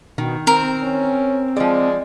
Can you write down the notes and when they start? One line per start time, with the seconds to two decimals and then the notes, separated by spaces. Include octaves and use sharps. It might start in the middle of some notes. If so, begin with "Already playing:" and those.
0.18 B2 D#3
0.47 C4 A#4
0.82 C#4
1.57 F3 G#3 D5